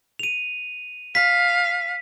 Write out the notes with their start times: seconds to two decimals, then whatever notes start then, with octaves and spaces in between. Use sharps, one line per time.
0.19 D#7 F7
1.15 F5 B6